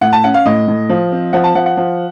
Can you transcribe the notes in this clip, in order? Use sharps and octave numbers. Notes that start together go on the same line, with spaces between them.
A2 F#5
A5
C#4 F#5
F5
A2 D#5
A2
F3
C4
F3 F#5
A5
F3 F#5
F#5
F3